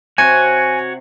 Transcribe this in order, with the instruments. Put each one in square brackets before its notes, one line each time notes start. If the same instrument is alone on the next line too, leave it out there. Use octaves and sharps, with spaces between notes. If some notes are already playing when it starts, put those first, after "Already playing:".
[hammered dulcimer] C3 [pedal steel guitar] F#4 C#5 [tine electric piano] G#5